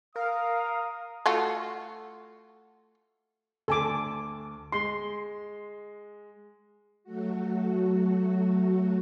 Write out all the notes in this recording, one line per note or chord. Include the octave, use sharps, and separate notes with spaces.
A#4 F5 D#6
A3 F4 F#4
D2 A4 G#5 D6
G#3 C6
F#3 A3 F#4